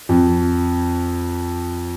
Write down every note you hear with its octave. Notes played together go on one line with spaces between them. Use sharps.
F2